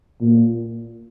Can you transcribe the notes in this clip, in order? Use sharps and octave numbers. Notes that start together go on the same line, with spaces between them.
A#2